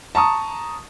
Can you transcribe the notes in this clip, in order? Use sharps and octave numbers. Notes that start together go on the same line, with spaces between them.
A5 A#5 C#6 D#6